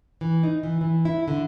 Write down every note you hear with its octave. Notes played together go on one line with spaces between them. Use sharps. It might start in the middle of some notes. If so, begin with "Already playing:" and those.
E3
D#4
E3
E3
E4
D3